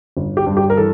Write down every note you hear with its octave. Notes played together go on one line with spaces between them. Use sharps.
G1
G4
G2
G4
A#4
E3 A4